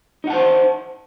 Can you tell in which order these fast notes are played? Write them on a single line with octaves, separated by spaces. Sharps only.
D#4 F#5 A5 C5